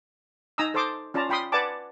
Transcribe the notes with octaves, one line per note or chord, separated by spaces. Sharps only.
D#4 G#5 A#5 D#6 E6
A4 C5 A5 C6 D6 D#6
C#4 F4 D5 A5 A#5
F4 G5 B5 C6 D#6
B4 D5 F#5 G#5 A5 D6